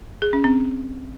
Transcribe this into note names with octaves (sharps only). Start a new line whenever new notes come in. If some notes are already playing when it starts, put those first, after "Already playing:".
G#4
C#4
C4